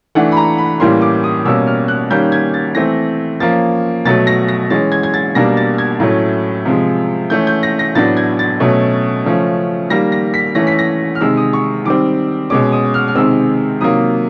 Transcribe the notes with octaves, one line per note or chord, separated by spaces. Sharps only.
E3 A3 D4 F#5
B5
A#5
B5
A2 E3 G3 A#3 C#4 C6
D6
D#6
B2 G3 A#3 C#4 E6
F6
F#6
D#3 G3 A#3 C#4 G6
G#6
A6
E3 A3 C4 A#6
F3 A#3 C#4 A6
B2 F#3 A3 A6
A#6
A#6
E3 G#3 C#4 A6
G#6
G#6
A6
B2 G3 A#3 D4 A#6
A6
G#6
A2 F#3 A3 C#4
C3 F3 G#3
E3 A3 C#4 G6
G6
A#6
A#6
A2 F#3 B3 D4 A6
G#6
A6
B2 F#3 A3 C#4
C#3 F3 A3 C#4
D#3 G3 A#3 A#6
A#6
B6
E3 A3 C#4 A#6
B6
A#6
F6
C3 D#3 G#3 E6
D#6
C#6
D#3 G3 C4 D6
B2 G#3 C#4 D6
D#6
F6
F6
C3 D#3 G#3 C4 E6
C3 D#3 F#3 A#3 D#6